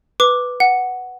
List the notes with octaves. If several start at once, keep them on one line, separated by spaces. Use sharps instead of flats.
B4 D6
F#5